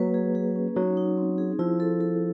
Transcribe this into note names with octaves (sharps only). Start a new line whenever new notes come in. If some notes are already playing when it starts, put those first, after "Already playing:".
Already playing: F#3 A#3 B4
G#4
G#4
C#4
F#3 D#4
D#4
C4
G#4
F3 E4
A4
A4